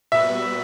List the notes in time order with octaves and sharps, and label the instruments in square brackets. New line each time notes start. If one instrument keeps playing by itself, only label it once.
[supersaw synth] A#2 G3 B3 F#4 B4 [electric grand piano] E5 E6